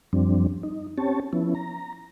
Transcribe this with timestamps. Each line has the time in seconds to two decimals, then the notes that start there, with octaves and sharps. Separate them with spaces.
0.13 F#2 F3 G3 C4 D4
0.63 D#4
0.98 C4 C#4 G4 C#5 A5
1.33 F3 B3 C#4 E4
1.55 A#5